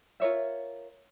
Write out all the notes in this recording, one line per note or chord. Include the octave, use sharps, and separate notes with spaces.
F4 A#4 C#5 E5